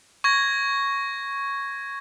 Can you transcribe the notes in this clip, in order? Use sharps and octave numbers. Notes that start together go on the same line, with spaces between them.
C#6 G#6 A#6